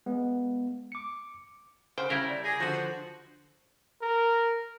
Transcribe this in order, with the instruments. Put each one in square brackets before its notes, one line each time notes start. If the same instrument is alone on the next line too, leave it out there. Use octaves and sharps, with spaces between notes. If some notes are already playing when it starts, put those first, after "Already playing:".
[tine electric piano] G#3 B3
D6 C#7
[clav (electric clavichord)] C#3 G5 [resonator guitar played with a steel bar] C5 [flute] F#5
[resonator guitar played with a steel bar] C#3 G3 [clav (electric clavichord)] E4 A#4 [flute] B5
[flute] D5
[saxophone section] G4 G#4 [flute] A#6
[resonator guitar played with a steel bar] D3 F3 [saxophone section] F#4 [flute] C5
[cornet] A#4